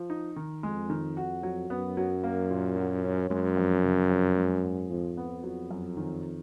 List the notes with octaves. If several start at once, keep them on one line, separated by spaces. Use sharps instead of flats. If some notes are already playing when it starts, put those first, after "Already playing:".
Already playing: F3
D#4
D#3
F2 G#3
D#3
F#4
F#3
F#2 B3
F#3
A#3
A#2
F#3
C#4
F#2 G#3
F2
C#3
F2
G#3
G#2
F2 F3
B3
F#3
F#2
D#3